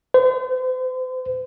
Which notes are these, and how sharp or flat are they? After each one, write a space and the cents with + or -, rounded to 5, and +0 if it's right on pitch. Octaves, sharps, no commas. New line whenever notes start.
C5 -40